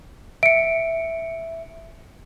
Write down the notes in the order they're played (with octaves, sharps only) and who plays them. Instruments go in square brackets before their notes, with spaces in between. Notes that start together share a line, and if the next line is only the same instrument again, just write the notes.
[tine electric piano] E5 [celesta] C#7 D7